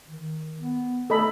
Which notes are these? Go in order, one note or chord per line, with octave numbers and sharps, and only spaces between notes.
D#3
B3
A3 A4 D#5 B5